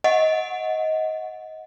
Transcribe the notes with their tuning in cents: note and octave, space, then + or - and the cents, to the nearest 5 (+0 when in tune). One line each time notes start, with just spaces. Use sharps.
D#5 +20 F#5 -10